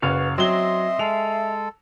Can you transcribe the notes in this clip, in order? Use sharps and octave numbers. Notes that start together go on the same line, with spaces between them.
F#1 F#4 B4 F5
F#3 C4 D#5 E5 C6 G7
G#3 A4 F5 F7